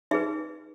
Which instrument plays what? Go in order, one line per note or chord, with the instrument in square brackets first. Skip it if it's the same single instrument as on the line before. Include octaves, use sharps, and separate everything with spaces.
[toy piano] D#4 G#4 B4 E5